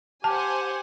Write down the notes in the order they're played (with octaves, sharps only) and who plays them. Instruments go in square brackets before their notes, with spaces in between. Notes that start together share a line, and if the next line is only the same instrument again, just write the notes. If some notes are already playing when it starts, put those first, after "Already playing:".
[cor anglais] G4 [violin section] C5 F#5 G#5 [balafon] A5